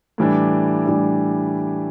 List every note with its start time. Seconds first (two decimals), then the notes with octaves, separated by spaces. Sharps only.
0.18 A2 E3 G3 D4
0.86 A2 E3 G3 D4